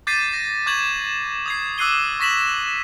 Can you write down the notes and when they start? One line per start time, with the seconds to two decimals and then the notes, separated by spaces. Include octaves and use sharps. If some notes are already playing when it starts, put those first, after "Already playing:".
0.07 D6 G6 A6 B6 C7 D#7
0.33 A#6
0.66 C#6 D6 G6 G#6 E7 F#7
1.46 D#6 G#6 C7
1.78 D6 E6 F#6 C7 D#7 G7
2.20 C#6 A#6 B6 E7 F#7